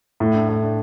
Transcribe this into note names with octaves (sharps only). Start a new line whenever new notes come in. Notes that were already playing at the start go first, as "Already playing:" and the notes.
A2
D4
A2
D4